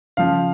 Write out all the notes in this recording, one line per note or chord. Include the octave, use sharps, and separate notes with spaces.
C#3 F3 F5